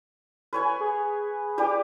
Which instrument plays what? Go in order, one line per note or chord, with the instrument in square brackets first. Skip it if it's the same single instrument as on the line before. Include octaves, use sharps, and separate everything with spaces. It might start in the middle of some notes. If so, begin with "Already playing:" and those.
[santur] B4 C#5 G#5
[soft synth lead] G#4
[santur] G4 B4 D5